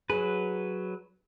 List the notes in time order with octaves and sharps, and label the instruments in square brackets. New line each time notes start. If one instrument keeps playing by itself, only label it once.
[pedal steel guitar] F#3 B4 [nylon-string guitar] G#4